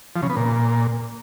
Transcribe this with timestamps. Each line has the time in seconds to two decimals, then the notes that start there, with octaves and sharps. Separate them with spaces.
0.16 F3
0.23 C#3
0.30 B3
0.37 A#2